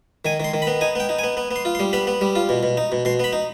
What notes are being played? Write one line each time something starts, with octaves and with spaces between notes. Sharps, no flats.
D#3 G#5
D#3 C6
D#3
B5
B3
D#4 G#5
B3 G5
D#4
G#5
B3
B3
B3
C6
F4
C6
G3
B3 B5
B3
G3
F4
B2
B2
D#4
B2
B2 C6
B3 B5
D#4